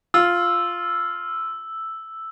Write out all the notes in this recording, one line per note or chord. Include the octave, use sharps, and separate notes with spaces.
F4 E6